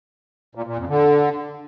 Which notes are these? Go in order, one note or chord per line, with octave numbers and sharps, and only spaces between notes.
A#2
A#2
F2
D3